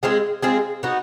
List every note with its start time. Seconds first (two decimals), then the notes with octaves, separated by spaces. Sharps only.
0.03 G#3 C4 F4 G#4
0.43 G#3 C4 F4 G#4
0.83 B3 D#4 F#4